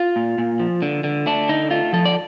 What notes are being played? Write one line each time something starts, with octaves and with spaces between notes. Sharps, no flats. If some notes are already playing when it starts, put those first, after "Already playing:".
Already playing: F4
A#2
A#2
F3
D3
D3
A3 D4
D3 D#4
A3 F4
F3 A4
D5